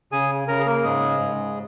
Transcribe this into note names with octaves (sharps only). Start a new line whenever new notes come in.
C#3 G#4 G#5
C#3 A#4 A#5
G#4
A#3 A#4
G#2 G#3 G#4
G#2